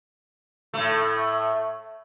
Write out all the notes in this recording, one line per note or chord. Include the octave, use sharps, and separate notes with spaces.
A2 A3